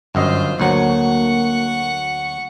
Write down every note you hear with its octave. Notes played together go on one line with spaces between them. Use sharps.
G1 F#2 F4 C5 D#5
D2 F#3 A#3 F#5 C#6